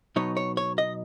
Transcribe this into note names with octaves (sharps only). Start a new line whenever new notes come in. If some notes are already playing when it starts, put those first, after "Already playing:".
B2 F#3 B3 D#4 C#5
C#5
C#5
D#5